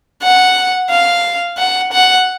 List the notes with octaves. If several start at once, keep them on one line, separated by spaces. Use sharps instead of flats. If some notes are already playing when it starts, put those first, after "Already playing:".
F#5
F5
F#5
F#5